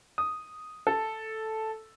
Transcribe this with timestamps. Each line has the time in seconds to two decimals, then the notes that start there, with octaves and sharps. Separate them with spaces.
0.18 D#6
0.87 A4